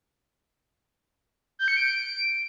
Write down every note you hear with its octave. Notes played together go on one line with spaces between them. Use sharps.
G6
C#7
D7